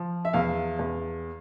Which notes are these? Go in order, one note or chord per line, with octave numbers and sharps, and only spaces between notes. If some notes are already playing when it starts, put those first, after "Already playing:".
Already playing: F3
E5
E2 F5
E2